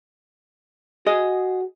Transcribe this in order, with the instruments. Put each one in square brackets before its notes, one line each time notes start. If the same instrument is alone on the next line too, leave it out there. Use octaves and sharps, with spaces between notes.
[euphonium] F#4 [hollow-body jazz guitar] G#4 D#5